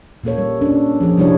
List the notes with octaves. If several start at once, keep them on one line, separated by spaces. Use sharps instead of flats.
A#2 A#3 A4 C#5
G3
C#4 D4 A4
F3 G#4
C3 G3 D4 E4 A4 C#5